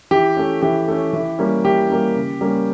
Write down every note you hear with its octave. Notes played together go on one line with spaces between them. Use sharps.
E3 G4
A3 C#4
E3 G4
A3 C#4
E3
G3 A#3 C#4
E3 G4
G3 A#3 C#4
C#3
G3 A#3 C#4